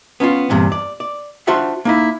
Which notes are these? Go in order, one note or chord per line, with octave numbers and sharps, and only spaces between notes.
B3 C#4 D#4 F4
E2 G2 A#2 C4
D5
D5
D4 F4 F#4 C5 E5 F#5
A#3 D#4 E4